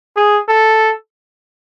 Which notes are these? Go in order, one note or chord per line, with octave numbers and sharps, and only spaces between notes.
G#4
A4